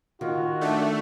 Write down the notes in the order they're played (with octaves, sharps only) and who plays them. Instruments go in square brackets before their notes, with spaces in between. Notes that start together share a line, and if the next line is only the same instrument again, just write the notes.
[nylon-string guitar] D#3 [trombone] F4 [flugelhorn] F#4
[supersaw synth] A3 [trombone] D4